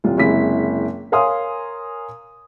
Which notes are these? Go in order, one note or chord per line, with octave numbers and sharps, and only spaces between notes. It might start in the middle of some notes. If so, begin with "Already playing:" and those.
D#1 C2 F4
F#1 C3 G#3 E4 B6
A#4 C#5 F5 G#5 C6 D#6